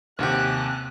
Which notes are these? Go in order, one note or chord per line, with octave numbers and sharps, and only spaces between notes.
D#2 C3 C#4 F#4 G4 F#6